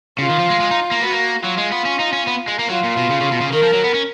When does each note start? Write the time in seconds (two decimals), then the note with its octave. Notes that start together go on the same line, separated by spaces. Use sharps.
0.19 C#3 F4
0.30 D#3
0.39 F3
0.50 G#3
0.60 G#3
0.71 D#4
0.91 A#3
1.02 B3 F#4
1.12 A#3
1.44 F#3 F4
1.58 G#3
1.72 B3
1.86 C#4
2.00 D#4
2.13 C#4
2.28 B3
2.48 G#3
2.59 A#3
2.69 F#3 F4
2.84 A#2
2.97 B2
3.11 C#3
3.21 C#3
3.32 B2
3.42 C#3
3.53 D#3 A#4
3.63 F3
3.74 F#3
3.84 B3
3.94 C#4